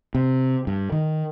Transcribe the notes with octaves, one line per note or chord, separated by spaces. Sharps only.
C3
G2
D#3